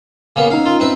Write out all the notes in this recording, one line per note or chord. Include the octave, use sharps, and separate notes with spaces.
C#3 A#3 B3
C#4 D#4 F5
F4
C4 B4 E5